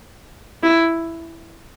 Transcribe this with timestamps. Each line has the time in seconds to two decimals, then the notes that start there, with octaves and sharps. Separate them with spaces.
0.63 E4